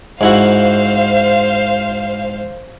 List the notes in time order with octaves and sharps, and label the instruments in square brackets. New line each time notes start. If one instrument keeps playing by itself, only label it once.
[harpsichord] G#2 E4 F#4 [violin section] C5 F5